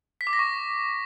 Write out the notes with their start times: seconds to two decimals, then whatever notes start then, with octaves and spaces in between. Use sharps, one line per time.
0.21 B6
0.27 D6
0.33 A#6
0.39 C#6